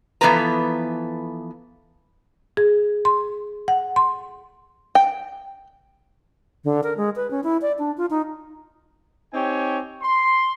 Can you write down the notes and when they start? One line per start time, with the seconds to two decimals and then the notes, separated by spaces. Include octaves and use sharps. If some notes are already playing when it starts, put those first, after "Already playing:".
0.21 E3 F3 B3 A4 B4 A#5
2.57 G#4
3.05 C6
3.68 F#5
3.96 C6
4.95 G5
6.65 D3
6.84 A#4
6.97 G#3
7.16 B4
7.31 C#4
7.44 E4
7.62 D5
7.79 D4
7.98 F4
8.10 D#4
9.33 C4 D#4 G4 C#5 G5 G#5
10.01 C6